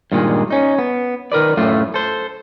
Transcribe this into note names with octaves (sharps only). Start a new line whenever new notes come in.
G2 A#2 D#3 G#3
C#4 D#4
B3
D#3 A#4 B4 D5
F#2 A2 A3 F4
A4 C5